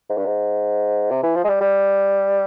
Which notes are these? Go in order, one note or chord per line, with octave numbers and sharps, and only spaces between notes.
G#2
G2
G#2
C3
E3
F3
G#3
G3
G3